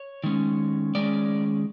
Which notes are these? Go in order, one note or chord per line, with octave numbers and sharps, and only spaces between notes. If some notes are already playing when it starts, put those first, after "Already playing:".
Already playing: C#5
D#3 G#3 C#4
D#3 G#3 C#4 D5